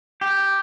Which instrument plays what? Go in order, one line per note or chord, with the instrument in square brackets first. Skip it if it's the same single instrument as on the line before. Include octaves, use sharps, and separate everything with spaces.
[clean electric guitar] G4